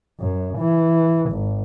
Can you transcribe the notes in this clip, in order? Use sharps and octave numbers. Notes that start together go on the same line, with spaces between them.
F#2
E3
G#1